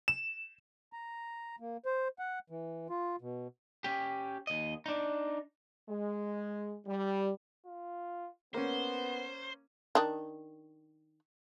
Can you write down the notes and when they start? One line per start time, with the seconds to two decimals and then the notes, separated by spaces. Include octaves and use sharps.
0.08 E7
0.93 A#5
1.60 A#3
1.85 C5
2.19 F#5
2.50 E3
2.90 F4
3.21 B2
3.84 C#4 G4
4.47 D#2 D#5
4.86 D4 D#4
5.88 G#3
6.87 G3
7.66 F4
8.54 A#3 B3 C#4 C5
9.95 D#3 D4